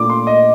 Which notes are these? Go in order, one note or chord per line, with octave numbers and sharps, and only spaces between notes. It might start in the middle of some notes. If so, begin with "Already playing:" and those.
Already playing: A#2 A3 D4 F4 D6
C6
D#5